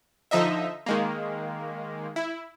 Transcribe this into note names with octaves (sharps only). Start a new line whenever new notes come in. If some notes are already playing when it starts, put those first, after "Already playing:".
D3 F3 D#4 D#5 E5
D#3 G#3 A#3
E4